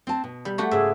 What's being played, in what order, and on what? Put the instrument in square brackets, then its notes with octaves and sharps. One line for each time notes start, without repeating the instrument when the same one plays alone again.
[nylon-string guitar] C4 A5
B2
[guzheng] G3
A3 F#4 G4
[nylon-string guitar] G#2 C#3 [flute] G#4 [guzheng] E5